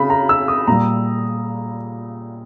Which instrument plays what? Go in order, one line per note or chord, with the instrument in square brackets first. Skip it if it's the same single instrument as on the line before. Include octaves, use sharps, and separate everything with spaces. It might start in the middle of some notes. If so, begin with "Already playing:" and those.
Already playing: [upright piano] C#3 B5
A#5
E6
D#6
A#2 G3 A#5